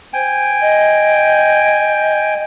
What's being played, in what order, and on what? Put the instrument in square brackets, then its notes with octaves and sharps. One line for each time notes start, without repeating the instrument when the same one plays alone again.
[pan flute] C5 [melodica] G5 G#5
[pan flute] D#5